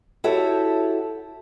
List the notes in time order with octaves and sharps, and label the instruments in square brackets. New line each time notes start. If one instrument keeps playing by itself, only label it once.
[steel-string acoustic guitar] E4 F#4 G4 A4 C#5 E5